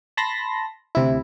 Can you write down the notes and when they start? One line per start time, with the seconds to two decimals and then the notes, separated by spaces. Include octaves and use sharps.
0.17 A5 B5 C6 A#6
0.95 D2 C3 E4